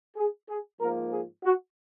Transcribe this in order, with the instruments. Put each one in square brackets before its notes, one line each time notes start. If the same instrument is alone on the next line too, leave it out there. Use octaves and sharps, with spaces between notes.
[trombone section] G#4
G#4
G#2 F3 A#3 A#4
G#4
F#4